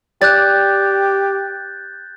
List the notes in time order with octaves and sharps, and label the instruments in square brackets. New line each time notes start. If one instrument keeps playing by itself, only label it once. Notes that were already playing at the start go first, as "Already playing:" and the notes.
[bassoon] G4 [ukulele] D5 [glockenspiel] F#6 G6 A6